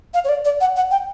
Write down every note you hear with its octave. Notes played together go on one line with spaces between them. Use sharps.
F5
C#5
D5
D5
F#5
F#5
G5